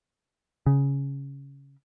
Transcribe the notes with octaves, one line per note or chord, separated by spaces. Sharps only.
C#3